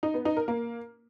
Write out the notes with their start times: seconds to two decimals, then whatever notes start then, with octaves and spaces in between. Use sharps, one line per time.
0.03 D#4
0.14 B3
0.25 D#4
0.37 A#4
0.48 A#3